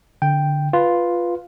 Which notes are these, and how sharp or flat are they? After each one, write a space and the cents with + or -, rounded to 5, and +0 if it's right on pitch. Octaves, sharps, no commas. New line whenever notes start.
D3 +0 G5 +0
F4 +0 B4 +0